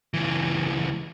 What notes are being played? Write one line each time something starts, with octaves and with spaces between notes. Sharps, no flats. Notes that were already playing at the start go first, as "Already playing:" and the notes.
C#2 E3